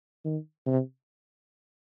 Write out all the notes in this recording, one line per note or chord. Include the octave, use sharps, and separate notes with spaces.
D#3
C3